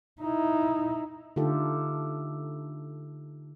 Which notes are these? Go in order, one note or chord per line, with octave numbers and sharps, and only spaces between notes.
D#4 E4
D3 A3 D#4 F4 G4 A4